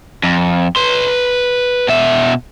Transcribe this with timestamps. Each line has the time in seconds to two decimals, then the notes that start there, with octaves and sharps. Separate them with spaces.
0.23 F2
0.76 B4 C6
1.88 B2 E5